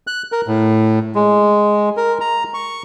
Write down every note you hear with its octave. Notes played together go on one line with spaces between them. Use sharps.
F#6
A#4
A2
G#3
A#4
A#5
C#6